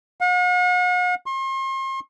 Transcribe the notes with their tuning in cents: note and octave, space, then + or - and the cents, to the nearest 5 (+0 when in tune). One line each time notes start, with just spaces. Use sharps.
F#5 -45
C6 +40